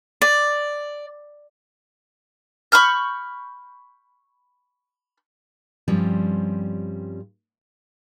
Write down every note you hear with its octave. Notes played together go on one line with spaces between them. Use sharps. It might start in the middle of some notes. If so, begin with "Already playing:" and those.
D5
B5 C#6 F6 G6
G2 F3 G3 C4 C#4